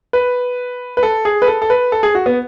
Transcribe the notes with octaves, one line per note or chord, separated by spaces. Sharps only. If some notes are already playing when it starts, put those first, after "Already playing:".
B4
B4
A4
G#4
B4
A4
A4
B4
A4
G#4
F#4
B3